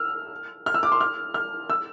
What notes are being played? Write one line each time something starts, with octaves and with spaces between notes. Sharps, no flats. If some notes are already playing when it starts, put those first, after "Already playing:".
Already playing: E6 F6
F6
E6
D6
C6
F6
F6
E6